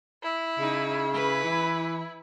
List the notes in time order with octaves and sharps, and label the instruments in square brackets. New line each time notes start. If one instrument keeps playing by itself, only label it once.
[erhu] E4
[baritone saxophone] C#3 [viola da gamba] D#4
[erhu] E4 [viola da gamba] B4
[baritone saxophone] E3